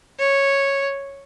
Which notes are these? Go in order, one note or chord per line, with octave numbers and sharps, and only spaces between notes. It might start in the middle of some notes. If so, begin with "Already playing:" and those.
C#5